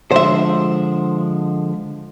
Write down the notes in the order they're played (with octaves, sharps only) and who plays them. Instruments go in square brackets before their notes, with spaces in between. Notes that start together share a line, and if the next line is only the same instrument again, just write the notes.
[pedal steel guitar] D3 F3 G#3 [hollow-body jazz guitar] C5 E5